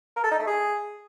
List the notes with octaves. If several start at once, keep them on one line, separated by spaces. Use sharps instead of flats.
A#4
A4
D#4
A3
G#4